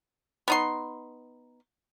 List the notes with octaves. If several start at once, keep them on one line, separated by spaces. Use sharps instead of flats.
B3 D#4 C6